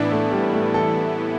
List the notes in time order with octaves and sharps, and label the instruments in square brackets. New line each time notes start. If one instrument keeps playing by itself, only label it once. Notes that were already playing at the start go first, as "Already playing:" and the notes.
Already playing: [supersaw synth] A2 E3 B3 E4 [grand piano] D4
[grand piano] A3
G3
A3
A4